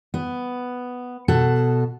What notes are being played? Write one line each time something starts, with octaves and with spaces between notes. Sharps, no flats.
B3
B2 A4 F#5